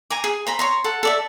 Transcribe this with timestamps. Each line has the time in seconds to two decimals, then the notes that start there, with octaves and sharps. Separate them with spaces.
0.10 G#5 A#5 D6
0.24 G#4
0.47 C5 A#5 B5
0.59 C#5 A#5 C6
0.84 A4 F#5
1.03 A4 D5 E5